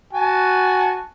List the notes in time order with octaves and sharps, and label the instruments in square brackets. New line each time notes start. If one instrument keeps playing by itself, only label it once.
[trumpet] F#4 [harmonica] G#5 A5